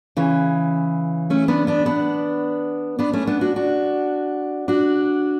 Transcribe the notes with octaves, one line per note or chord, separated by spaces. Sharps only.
C#3 E3
A3 C#4
B3 D4
B3 D4
B3 D4
B3 D4
A3 C#4
B3 D4
D4 F#4
D4 F#4
D4 F#4